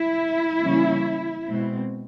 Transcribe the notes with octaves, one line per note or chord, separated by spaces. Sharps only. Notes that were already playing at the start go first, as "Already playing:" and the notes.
Already playing: E4 E5
C#3 E3 G3 A#3 C#4
B2 G#3 C4